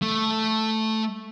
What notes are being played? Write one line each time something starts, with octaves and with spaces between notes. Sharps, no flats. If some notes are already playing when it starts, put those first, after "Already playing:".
A3